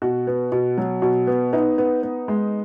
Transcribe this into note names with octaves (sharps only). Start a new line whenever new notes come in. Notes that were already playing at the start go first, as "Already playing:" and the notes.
B2 F#4
B3
B2
F#3
B2
B3
B3 D#4
B3
B3
G#3